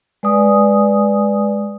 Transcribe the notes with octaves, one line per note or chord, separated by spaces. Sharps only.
G#3 B4 D5 G#5 D#6